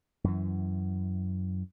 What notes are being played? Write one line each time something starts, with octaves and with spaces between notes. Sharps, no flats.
F#2 E3